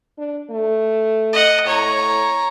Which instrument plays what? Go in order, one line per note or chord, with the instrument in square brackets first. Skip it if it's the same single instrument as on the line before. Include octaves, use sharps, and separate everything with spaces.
[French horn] D4
A3
[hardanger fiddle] D#5 F#5
[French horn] A2 [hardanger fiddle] C#5 A#5